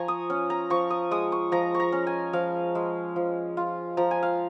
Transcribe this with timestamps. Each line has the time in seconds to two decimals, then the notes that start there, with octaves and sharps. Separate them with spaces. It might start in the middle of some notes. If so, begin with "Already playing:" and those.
Already playing: F3 G#5 A#5 C#6
0.08 D#6
0.30 C#4
0.50 A#5
0.70 F3 C#6
0.90 D#6
1.11 G#3 D#6
1.32 C#6
1.52 F3 A#5
1.75 C#6
1.80 A#5
1.92 C#4
2.07 G#5
2.33 F3 F5
2.75 G#3
3.16 F3
3.57 F4
3.97 F3 A#5
4.11 G#5
4.23 F5